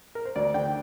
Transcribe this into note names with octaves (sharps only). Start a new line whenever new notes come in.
A#4
C5
D2 D5
D3 G5